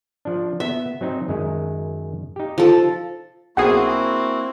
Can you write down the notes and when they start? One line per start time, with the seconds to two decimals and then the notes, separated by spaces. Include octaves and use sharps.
0.25 F3 D4
0.60 B3 E5
1.01 F#3 C4 D#4
1.28 F#2 D#3 G#3
2.36 D#4 G4
2.58 F3 A4
3.57 B1 A#3 C4 E4 F#4 G#4 F#5 C7